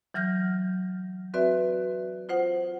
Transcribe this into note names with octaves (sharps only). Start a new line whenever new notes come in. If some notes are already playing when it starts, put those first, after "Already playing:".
E3 F#3 F6 G6 A#6
C4 F#4 B4 D5 E5
F4 C5 F#5